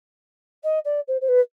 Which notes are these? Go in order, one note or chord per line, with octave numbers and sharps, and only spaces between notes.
D#5
D5
C5
C5
B4